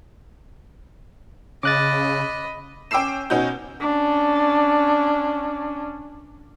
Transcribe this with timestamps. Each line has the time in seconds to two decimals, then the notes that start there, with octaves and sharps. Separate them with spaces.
1.63 C#3 D#5 B5 D6 F#6 A6
2.91 C#4 G5 D6 E6 C7 E7
3.30 B2 C#4 D#4 F#4 G6
3.81 C#4 D4